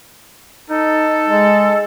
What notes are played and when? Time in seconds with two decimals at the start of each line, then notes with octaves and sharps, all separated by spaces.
0.70 D#4 A4
1.27 G#3